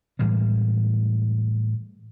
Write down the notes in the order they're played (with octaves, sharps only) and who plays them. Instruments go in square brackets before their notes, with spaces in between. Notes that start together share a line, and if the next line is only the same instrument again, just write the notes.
[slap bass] A2 E3 G3 G#3